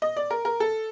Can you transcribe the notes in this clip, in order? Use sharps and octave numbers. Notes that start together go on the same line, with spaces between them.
D#5
D5
A#4
A#4
A4